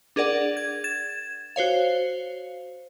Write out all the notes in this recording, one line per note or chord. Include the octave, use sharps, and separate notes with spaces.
D4 G#4 A#4 D5 F#5
G#6
G#6 A6 E7
F#4 C5 C#5 F5